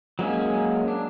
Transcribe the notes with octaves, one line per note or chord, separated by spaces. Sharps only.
F#3 G#3 A#3 C#4
D4